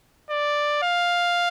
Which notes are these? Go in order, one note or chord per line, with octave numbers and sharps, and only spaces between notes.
D5
F5